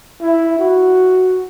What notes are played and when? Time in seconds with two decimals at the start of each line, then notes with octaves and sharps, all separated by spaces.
0.21 E4
0.59 F#4